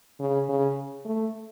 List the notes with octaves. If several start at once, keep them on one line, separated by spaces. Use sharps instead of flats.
C#3
C#3
A3